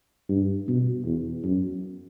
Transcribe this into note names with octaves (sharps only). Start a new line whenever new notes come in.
G2
B2
E2
F#2